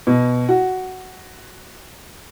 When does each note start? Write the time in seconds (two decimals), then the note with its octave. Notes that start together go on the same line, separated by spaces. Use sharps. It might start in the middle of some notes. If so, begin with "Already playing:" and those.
0.07 B2
0.49 F#4